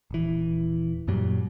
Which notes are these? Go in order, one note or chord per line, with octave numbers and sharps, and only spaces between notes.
D#1 E3
F#2 A#2 F#3 G3